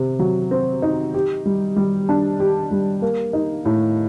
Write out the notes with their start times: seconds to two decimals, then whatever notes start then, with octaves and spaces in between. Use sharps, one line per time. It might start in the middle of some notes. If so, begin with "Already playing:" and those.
Already playing: C3
0.19 F#3
0.51 C4
0.82 D#4
1.14 G4
1.46 G3
1.77 G3
2.09 D4
2.40 G4
2.71 G3
3.02 A#3
3.33 D#4
3.65 A2